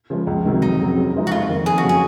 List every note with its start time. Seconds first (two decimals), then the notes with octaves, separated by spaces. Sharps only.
0.10 C#3 F3 G#3
0.27 C#2
0.45 C3 D#3 F#3
0.62 F2 D#4
0.80 C#3 F#3 C4
0.97 C#3
1.14 F3 G#3 D#4
1.27 F#4
1.31 F2 F4
1.49 D#3 A#3
1.66 F2 G#4
1.78 F#4
1.83 C#3 F#3 C#4
1.89 G#4